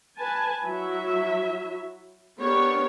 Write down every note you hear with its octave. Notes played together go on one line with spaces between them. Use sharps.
B4 G#5 A5
F#3 E4 E5
B3 D4 G4 A#4 C#5